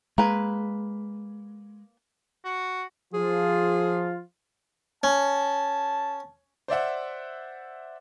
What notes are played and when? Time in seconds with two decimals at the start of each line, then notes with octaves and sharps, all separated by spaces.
0.18 G#3 A#3 B4
2.45 F#4
3.14 F3 F4 G#4
5.03 C#4 A5
6.68 C5 D5 E5 F#5